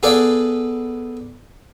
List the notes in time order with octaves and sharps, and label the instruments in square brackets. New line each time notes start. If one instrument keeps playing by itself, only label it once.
[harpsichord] B3 G#4 A4 B4 D5 F5